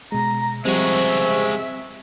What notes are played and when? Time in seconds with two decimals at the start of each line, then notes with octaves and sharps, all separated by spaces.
0.12 B2 G#3 A#5
0.65 C3 F3 G3 G#3 C4 F#4 E5